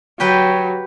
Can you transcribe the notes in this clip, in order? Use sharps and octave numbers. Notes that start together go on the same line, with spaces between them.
F#3 G4 B4 G5